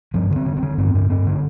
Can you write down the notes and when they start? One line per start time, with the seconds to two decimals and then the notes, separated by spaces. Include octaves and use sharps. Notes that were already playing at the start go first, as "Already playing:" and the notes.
0.14 G2 F3
0.30 D3
0.36 C4
0.46 D3
0.57 C4
0.63 D3
0.78 G2 C4
0.94 G2
1.10 G2 C4
1.27 D3